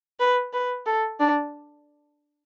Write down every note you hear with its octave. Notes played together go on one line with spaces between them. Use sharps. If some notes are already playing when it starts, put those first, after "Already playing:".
B4
B4
A4
D4